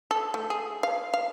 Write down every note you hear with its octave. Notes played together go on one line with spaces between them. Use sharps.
A4
A3
G#4
F5
F5